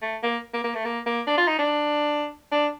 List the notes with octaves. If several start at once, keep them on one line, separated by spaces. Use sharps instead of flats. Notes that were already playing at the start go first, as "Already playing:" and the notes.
A3
A#3
A#3
A#3
A3
A#3
A#3
D4
F4
D#4
D4
D4